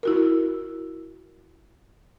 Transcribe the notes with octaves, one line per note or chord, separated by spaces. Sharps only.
E4 F#4 A#4